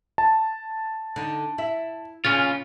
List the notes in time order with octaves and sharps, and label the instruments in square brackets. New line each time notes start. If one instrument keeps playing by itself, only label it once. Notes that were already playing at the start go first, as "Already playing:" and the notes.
[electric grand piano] A5
[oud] D3 D#4
E4 E5
[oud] A#2 C#3 [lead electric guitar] C#4 F4